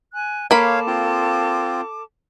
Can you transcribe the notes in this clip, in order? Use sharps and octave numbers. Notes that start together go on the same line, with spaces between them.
G#5 F#6
A#3 A4 C#5 F5 A5 B5 D6
C4 F4